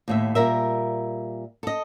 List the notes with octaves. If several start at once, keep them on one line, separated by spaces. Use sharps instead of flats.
D#2 A2 E5
A#2 G3 A#4 E5
A4 D#5